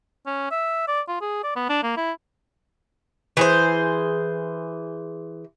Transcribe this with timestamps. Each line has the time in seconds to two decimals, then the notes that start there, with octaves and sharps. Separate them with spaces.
0.26 C#4
0.51 E5
0.88 D5
1.08 F4
1.21 G#4
1.43 D5
1.56 B3
1.69 D4
1.83 A#3
1.97 E4
3.37 E3 G#4 C5